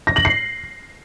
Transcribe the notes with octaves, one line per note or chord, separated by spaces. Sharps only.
A#6
F#7
C7